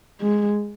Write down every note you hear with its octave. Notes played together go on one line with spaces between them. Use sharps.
G#3